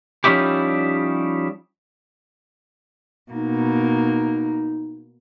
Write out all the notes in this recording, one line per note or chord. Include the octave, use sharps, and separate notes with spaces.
F3 G3 C#4 D#4 E4 G4
B2 A#3 D#4